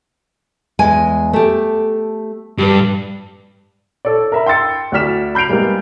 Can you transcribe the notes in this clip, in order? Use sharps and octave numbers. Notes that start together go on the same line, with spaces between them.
E2 G#3 G#5
A3 G4
G2 G4 B4
A4 C#5 D5
A#4 E5 B5
G5 C6 E6 A6 C#7
D2 F#4 D5 F6 B6 E7
B5 G6 C7 D7 F7
G3 G#3 A#3 B3